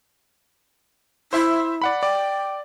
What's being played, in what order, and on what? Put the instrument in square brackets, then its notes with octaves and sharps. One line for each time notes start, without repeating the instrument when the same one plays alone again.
[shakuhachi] E4 [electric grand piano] C5 E5 C6
[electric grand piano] D5 F#5 B5
[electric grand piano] D5 [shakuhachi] G5